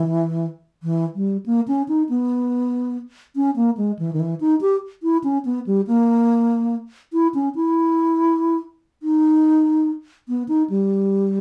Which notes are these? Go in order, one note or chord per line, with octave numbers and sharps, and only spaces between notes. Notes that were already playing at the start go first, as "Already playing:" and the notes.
Already playing: E3
E3
G3
A#3
C#4
D#4
B3
C#4
A#3
G#3
E3
D#3
E3
D#4
G4
E4
C#4
B3
G3
A#3
E4
C#4
E4
D#4
B3
D#4
G3